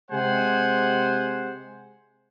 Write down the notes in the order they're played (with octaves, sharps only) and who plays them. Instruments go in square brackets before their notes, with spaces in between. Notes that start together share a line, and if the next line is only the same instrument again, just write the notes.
[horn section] C3 G#3 G4 C5 F#5 G#5